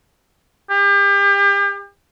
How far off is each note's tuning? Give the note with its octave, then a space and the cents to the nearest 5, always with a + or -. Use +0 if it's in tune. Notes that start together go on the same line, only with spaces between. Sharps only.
G4 +35